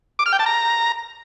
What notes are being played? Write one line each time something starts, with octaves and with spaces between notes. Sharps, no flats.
D6
F6
G5
A5
A#5